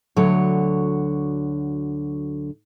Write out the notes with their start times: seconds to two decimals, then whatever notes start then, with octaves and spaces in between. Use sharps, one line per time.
0.16 D2 D3 F#3 C#5